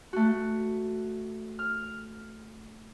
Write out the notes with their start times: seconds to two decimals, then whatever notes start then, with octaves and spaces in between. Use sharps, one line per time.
0.13 A3 F#4
1.59 F6